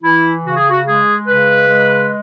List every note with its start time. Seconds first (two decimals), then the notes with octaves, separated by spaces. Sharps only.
0.03 E3 E4
0.45 C#3 F#4
0.56 G#4
0.70 F#4
0.86 G#3 G#4
1.27 C#3 B4
1.68 G#3